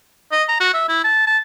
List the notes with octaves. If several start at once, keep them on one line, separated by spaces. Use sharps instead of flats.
D#5
A#5
F#4
E5
E4
A5
A5